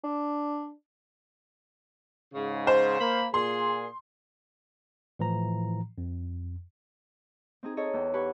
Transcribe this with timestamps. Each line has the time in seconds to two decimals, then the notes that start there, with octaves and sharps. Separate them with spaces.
0.04 D4
2.34 G#2 C#3
2.67 C5
3.00 A#3 B5
3.34 A#2 G#4 C6
5.19 A2 E3 F3 A#5
5.98 F2
7.63 C4 D#4 G#4
7.77 G#4 A4 C#5 D#5 A#5
7.93 E2 G5
8.14 G4 B4 F#5 G#5 B5 C#6